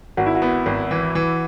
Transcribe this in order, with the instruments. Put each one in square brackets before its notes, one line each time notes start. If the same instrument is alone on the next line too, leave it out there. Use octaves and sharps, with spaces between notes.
[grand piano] G#1 [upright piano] F#4
[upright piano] E4
F#4
[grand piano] B3
G#1
E3
E3